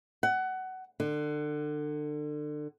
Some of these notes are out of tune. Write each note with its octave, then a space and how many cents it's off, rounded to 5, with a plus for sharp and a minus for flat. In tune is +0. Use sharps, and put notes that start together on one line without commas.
F#5 +20
D3 +30